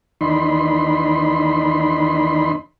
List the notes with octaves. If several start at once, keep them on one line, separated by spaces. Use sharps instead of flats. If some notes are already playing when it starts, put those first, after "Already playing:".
D#2 E3 D4 D#4 B5 C6